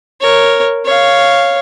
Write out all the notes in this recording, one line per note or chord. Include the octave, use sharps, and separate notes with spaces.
A#4 C#5
C#5 F5